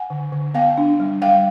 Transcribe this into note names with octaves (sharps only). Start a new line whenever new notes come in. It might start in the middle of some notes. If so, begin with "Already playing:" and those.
Already playing: F#5 G#5
D3
D3
B3 F5 G5
D4
G3
G3 F5 G5